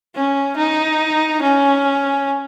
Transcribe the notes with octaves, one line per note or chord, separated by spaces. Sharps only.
C#4
D#4
C#4